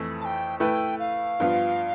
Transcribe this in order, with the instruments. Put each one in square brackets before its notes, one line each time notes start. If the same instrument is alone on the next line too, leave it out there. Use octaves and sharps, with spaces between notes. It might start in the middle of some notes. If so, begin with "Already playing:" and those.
Already playing: [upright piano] F2 E3 A3 E4
[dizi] A5
G5
[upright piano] A3 E4 B4 [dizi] G5
[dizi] F5
[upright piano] G2 F3 B3 F4